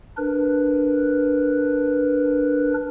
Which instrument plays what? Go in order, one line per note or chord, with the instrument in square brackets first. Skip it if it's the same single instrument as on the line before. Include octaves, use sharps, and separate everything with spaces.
[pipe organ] D4 A#4 B4